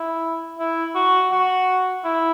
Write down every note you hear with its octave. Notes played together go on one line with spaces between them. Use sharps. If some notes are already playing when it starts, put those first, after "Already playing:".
Already playing: E4
E4
F#4
F#4
E4